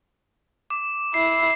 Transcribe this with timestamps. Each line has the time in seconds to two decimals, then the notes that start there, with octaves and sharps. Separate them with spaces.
0.70 D6
1.14 E4 C7